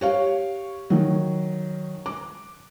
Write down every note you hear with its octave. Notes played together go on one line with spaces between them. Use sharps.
G4 C#5 F5
D#3 F#3
D6